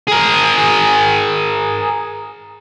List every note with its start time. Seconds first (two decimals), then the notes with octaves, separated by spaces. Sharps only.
0.07 G#4 A#4